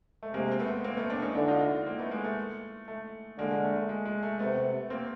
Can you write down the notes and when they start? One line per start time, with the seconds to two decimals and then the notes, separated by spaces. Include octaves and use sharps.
0.23 A3
0.34 C3 G#3 A#3
0.51 C4
0.59 A3 B3
0.84 A#3 C4
0.97 A3 B3
1.10 C4 D4
1.22 C#4 D#4
1.35 D3 D4 E4
1.48 D#4 F4
1.61 E4 F#4
1.86 A#3 C4
1.99 A3 B3
2.11 G#3 A#3
2.24 A3
2.88 A3
3.38 D3 G#3 A#3
3.51 G#3 A#3
3.64 A3
3.76 A3
3.89 G#3
4.05 G#3
4.23 A3
4.39 C3 A3 B3
4.90 A#3 C4